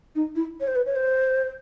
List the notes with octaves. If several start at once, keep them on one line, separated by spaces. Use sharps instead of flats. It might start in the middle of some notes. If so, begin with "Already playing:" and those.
D#4
E4
C#5
C5
B4
C#5
C5